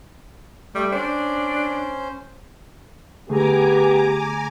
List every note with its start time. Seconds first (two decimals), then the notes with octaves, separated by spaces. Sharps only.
0.75 G3 A3 G5
0.92 C#4 D4 C5
3.29 D3 A3 B3 G4 G#4 G#5 A#5 D6